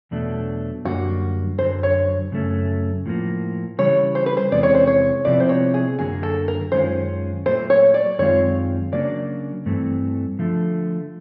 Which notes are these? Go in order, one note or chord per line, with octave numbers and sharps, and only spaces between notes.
E2 B2 F#3 A3 D4
F#2 D3 G3 A#3 F#4
F#2 D3 F#3 C5
C#5
F#2 C#3 F#3 A3 C#4
A2 F3 A#3
C#3 E3 G3 C#5
C5
B4
C5
E2 C3 E3 G#3 C#4 D5
C#5
C5
C#5
C3 F3 G#3 B3 E4 D5
C5
C#5
G#4
F#2 D3 F#3 A#3 G#4
A4
A#4
F#2 D#3 G#3 C#4 F4 C5
A#2 F#3 A3 C5
C#5
D5
F#2 D#3 G#3 C4 F4 C#5
C#3 F#3 A#3 D4 D5
G2 E3 A3 C4
D3 F3 A3